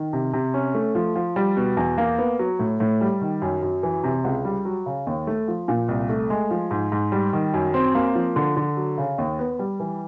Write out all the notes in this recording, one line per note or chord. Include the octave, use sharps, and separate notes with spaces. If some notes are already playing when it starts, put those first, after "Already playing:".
Already playing: D#3
C3
C3
C#4
A3
F3
F3
G3
B2
E2
A#3
B3
F#3
A2
A2
G3
D#3
F#2
F#2
E3
C3
C#2
G3
F#3
C#3
D#2
A3
F3
A#2
C2
A3
G#3
F3
G#2
G#2
G3
D#3
F#2
C4
A#3
F3
D3
D3
F#3
C#3
D#2
B3
G3
E3